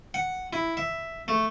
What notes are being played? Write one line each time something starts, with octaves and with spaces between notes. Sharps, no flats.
F#5
E4
E5
A3